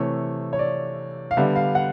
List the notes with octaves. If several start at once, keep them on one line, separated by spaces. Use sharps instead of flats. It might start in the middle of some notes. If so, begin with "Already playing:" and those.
Already playing: C3 E3 A3 C#5
C#5
D5
F5
D3 G3 B3 E5
F5
F#5